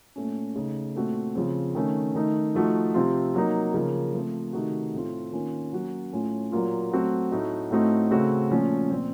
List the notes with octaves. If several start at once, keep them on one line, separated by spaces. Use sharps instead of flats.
A#2 A3 C#4
C#3 A3 D#4
A#2 A3 C4 F#4
C#3 F3 C4
D#3 A3 C#4
D#3 A3 D#4
F3 A3 D#4 F#4
C3 F3 C4 F4
F#3 A#3 D#4
C#3 F3 A#3
F3 A3 C4
C3 D#3 A3 D#4 F#4
A2 A3 C4 F4
D#3 A#3 C#4 F4
F#3 A#3 C#4 F#4
A2 A3 C#4 F4
A#2 F#3 A#3 F4
F#3 A3 C4 F#4
A2 A3 D#4 F#4
A2 A3 C4 D#4 F#4
C#3 A3 C4 F#4
A#2 F3 A3 C#4
A#2 F3 C4